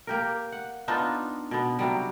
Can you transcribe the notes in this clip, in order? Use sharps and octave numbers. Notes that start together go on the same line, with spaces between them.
A#3 G4 A#4
F#5
B3 D4 D#4 F4
B2 B3
C3 F#3 G3